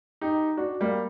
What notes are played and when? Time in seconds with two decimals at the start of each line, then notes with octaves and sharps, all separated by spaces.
0.21 D#4 G4
0.57 D4 F#4
0.81 G3 A#3